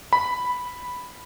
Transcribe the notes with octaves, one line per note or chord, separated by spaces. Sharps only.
B5